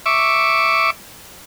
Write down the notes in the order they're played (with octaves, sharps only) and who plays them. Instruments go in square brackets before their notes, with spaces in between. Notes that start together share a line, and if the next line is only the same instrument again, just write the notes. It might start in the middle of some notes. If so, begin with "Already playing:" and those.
[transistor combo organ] E5 C#6 D6